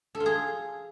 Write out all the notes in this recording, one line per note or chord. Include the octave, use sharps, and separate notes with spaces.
A4
F4
G#4